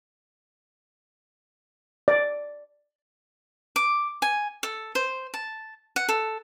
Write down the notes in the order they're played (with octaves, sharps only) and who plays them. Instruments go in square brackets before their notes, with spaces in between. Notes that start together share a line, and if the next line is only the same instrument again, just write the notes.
[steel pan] D5
[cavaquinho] D6
G#5
A4
C5
A5
F#5
A4